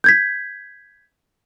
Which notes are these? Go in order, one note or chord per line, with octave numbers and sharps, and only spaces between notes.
G6 G#6 B6